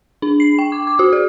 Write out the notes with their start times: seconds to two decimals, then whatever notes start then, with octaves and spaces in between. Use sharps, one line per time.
0.22 D4
0.40 C7
0.59 G5
0.72 D6
0.87 D6
0.99 F#4
1.12 G#4